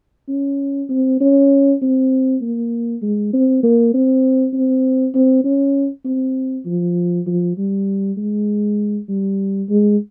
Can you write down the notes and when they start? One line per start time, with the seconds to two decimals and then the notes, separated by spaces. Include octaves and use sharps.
0.29 C#4
0.90 C4
1.21 C#4
1.82 C4
2.42 A#3
3.02 G#3
3.33 C4
3.63 A#3
3.94 C4
4.54 C4
5.14 C4
5.45 C#4
6.05 C4
6.66 F3
7.26 F3
7.58 G3
8.17 G#3
9.08 G3
9.70 G#3